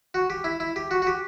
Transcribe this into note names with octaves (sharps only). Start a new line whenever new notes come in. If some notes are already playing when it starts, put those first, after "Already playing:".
F#4
G4
E4
E4
G4
F#4
F#4
G4